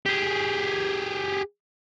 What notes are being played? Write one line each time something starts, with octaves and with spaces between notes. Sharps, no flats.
G4 G#4